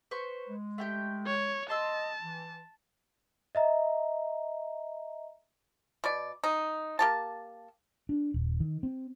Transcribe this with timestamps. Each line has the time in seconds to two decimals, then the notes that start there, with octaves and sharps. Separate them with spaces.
0.11 B4 C5 C#6
0.49 G#3
0.78 A3 G4 G5
1.27 C#5
1.70 D#5 A5 C6 E6
2.22 E3
3.55 D#5 E5 A#5
6.04 B2 D5
6.44 D#4
6.99 A#3 G4 A5
8.09 D4
8.34 D#1
8.60 D#3
8.83 C4